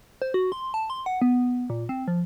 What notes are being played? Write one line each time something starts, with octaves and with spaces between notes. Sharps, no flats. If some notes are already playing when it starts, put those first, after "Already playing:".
C5
F#4
C6
A5
C6
F#5
B3
A#2
C4
F3